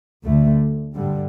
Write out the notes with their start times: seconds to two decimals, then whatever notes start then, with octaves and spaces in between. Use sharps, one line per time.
0.24 D2 D3 A3
0.94 G2 D3 G3